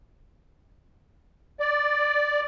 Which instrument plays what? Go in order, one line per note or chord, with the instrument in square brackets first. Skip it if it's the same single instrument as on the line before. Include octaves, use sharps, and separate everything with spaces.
[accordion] D5